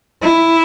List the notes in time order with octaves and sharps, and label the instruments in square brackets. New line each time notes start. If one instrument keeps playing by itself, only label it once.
[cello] E4